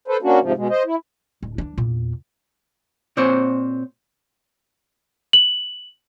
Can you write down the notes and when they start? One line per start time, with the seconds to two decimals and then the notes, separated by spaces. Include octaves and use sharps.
0.08 A4 B4 C5
0.23 A#3 C#4 D4 F#4
0.41 G#2 C3 F3
0.56 B2 G#3
0.70 C5 D#5
0.86 E4
1.43 D1
1.58 E3 D4
1.78 E2 A#2
3.17 A#2 C4 C5 C#5
5.33 F#7